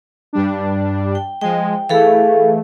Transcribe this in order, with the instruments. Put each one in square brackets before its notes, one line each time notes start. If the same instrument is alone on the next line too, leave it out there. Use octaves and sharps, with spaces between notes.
[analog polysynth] G2 G3 D4
[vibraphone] G5
[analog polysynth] F3 G#3 [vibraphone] G5
[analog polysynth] E3 A3 [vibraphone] G#4 A4 F5